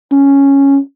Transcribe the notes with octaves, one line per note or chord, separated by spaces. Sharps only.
C#4